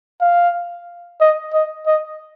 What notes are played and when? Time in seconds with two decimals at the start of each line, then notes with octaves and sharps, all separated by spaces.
0.21 F5
1.20 D#5
1.53 D#5
1.87 D#5